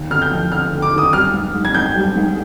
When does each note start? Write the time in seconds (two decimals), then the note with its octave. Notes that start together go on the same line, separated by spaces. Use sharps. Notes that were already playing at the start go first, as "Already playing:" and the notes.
Already playing: D#2
0.10 D3 F6
0.22 G6
0.32 F3
0.52 D3 F6
0.73 D3
0.82 D6
0.93 D#2 D#6
1.13 G3 F6
1.34 G#2
1.54 G#2
1.65 G#6
1.75 G#2 G6
1.96 G3
2.16 G#2